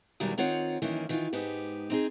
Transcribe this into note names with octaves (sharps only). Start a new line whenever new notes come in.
E2 B2 D#3 F#3 G3
D#3 C4 F4 C#5 F#5
F#2 D#3 E3 A#3 C#4
D#3 E3 F4
G#2 B3 D#4 G4
C4 D#4 G#4